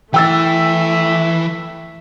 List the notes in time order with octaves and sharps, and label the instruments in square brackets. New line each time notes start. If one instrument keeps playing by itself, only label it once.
[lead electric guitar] E3 [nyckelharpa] A3 E5 [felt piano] G5 E6 A6